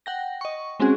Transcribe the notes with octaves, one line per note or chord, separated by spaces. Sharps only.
F#5 G5 A#6
D#5 C#6
G#3 C4 C#4 F#4 G#4